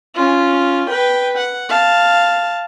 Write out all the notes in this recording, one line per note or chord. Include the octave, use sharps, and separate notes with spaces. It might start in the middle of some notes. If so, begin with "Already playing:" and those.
C#4 F4
B4 G5
F#5
F5 A5